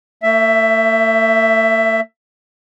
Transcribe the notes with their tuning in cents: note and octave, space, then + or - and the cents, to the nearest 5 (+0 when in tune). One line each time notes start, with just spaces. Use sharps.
A3 +45 E5 +10